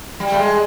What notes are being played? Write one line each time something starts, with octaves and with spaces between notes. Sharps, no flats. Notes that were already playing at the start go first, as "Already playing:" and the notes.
G3
A3
G#3